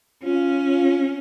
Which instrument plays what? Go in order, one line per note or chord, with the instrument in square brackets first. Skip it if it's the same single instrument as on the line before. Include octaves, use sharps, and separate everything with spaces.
[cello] C#4 [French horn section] F4